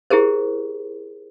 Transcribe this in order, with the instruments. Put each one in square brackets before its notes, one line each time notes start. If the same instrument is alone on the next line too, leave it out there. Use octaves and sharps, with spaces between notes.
[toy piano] E4 G4 G#4 A#4 C5